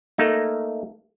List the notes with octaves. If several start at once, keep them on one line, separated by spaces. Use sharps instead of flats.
A3 A#3 D#4